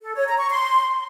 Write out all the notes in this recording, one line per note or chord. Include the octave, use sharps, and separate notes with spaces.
A4
C#5
A#5
C#6
C6